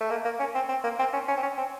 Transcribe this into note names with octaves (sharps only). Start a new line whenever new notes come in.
A3
A#3
A#3
C#4
C4
C4
A#3
C4
C#4
C#4
C4
C#4
C4